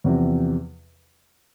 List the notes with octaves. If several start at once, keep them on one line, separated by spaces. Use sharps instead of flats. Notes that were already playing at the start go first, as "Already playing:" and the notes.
E2 C3 F3